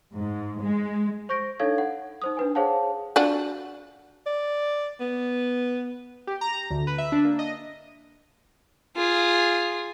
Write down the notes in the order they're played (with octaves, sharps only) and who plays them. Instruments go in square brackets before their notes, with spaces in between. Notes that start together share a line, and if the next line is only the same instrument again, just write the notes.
[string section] G#2
G#3
[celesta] C5 C#6 G6 A#6 D7
D4 D#4 A4 C#5 F5 G#6
F#5
D#4 C5 D#6
D4 B4 G#5
G#4 C5 C#5 F5 F#5 A5
[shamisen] D4 F4 F#4
[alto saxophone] D5
B3
[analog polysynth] G4
A#5
D2
B4
E5
D4
A#3
D#5
[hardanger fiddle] F4 G#4